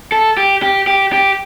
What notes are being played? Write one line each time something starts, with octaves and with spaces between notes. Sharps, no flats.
A4
G4
G4
G4
G4